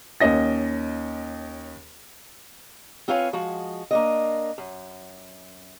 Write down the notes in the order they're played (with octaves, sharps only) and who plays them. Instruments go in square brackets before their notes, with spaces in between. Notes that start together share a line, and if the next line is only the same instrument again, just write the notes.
[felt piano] D#2 C#4 D#5 A#6
[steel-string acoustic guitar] C4 F4 B4 C#5 F5 G#5
F3 G#3 F#4
A#3 D4 D#5
F#2